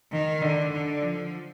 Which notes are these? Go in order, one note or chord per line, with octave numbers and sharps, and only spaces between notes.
D#3
D3
D3
F3